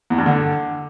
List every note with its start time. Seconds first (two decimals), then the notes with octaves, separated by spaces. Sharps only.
0.10 E2
0.18 G2
0.26 D3